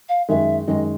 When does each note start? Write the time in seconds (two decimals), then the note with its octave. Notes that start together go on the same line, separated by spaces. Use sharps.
0.09 F5
0.29 F#2 D#3 G#3 E5
0.67 F#2 D#3 G#3 D#5